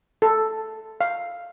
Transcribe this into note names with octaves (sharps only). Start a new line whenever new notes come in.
A4
F5